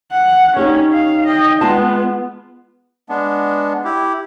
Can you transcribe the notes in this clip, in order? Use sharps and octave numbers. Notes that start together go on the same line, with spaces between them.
F#5
C#4 D#4 G4 C#5
F5
D#5 G5
G#3 B3 F4 A5
G#3 B3 D4
E4 G4